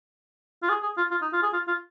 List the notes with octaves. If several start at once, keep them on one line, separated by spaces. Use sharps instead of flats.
F4
G#4
G#4
F4
F4
D#4
F4
G#4
F4
F4